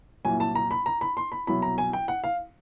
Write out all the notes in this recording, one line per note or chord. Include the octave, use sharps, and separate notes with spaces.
C2 A#2 F#3 G#5
A5
A#5
B5
A#5
B5
C6
B5
C2 B2 F#3 B5
A#5
G#5
G5
F#5
F5